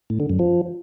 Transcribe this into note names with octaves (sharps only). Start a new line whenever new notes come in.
A2
D3
F#2
F3